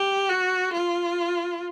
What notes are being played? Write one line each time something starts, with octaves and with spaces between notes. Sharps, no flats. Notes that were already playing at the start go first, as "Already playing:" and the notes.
Already playing: G4
F#4
F4